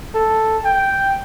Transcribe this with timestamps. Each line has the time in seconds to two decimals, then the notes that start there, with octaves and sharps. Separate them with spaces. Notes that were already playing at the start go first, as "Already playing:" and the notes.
0.15 A4
0.65 G5